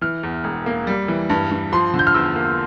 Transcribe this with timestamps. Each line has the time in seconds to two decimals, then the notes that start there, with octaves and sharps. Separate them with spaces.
0.02 E3 F6
0.23 E2
0.44 E1
0.66 A#3
0.87 G3
1.08 E3
1.30 G2
1.51 G2
1.72 F3 C6
1.94 D3
1.99 G6
2.07 F6
2.14 E2 E6
2.36 A#3